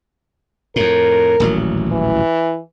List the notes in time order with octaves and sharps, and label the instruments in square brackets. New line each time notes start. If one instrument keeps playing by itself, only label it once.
[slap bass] F2 A2 [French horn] A#4
[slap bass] D#1 A1 F#3
[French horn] E3